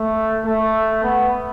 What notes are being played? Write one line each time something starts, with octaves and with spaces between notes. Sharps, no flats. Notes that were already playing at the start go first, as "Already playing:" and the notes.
Already playing: A3
A3
B3